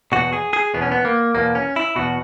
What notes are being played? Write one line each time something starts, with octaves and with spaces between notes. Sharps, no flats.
E2 B2 F#4
G#4
G#4
E2 B2 B3
C#4
B3
A#3
E2 B2 A#3
C#4
E4
E2 B2 F#4